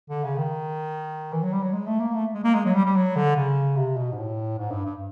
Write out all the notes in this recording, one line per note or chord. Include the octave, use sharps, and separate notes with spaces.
D3
C#3
D#3
E3
F#3
G3
F#3
G#3
A3
A#3
A3
G#3
A#3
G#3
F#3
G3
G3
F#3
D3
C#3
C3
B2
G#2
A2
G#2
G2
G2